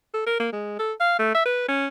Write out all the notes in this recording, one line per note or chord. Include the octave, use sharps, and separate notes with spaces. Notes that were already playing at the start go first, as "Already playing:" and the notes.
A4
A#4
A#3
G#3
A4
F5
A3
E5
B4
C#4